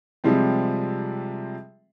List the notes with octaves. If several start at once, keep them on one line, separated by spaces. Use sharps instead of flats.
C3 F3 G3 G#3 C4